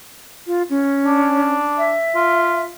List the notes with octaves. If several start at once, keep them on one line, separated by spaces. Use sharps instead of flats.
F4
C#4
D4
E5
F4